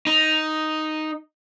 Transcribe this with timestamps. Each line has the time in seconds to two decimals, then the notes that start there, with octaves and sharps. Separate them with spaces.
0.07 D#4